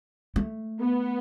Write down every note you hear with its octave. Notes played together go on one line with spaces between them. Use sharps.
A3
B3